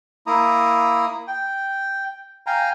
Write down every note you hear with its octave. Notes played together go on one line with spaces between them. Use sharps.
A#3 E4 A#5 D#6
G5
F5 G5 G#5 A#5